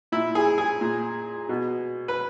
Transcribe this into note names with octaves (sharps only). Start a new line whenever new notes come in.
A#2 E4
G#4
G#4
A#2
B2
B4